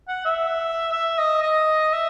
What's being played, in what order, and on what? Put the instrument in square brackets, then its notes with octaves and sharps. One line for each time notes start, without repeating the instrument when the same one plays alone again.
[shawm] F#5
E5
E5
D#5
D#5
E5